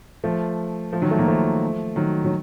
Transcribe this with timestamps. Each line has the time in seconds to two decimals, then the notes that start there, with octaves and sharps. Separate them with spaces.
0.24 F3 A3
0.93 F3 A3
1.02 D#3 F#3
1.11 F3 A3
1.18 F#3 A#3
1.28 F3 A3
1.96 D#3 F#3
2.25 F#3